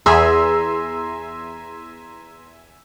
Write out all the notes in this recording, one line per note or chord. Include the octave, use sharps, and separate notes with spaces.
E2 G#4 E5 G#5 A#5 C6 E6